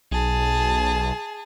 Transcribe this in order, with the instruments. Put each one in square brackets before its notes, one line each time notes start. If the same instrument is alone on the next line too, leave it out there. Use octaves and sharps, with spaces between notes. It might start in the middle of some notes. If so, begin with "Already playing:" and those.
[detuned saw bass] B1 [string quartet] G#4 A5